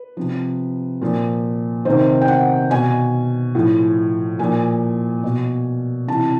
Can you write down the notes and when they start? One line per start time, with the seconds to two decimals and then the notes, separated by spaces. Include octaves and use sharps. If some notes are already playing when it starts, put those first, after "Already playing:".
Already playing: B4
0.17 C3 F3
1.02 A#2 F3
1.85 C3 D#3 C5
2.21 G5
2.28 F#5
2.70 B2 G#5
3.55 A2 F3
4.39 A#2 F3 G#5
5.24 B2
6.08 C3 E3 A5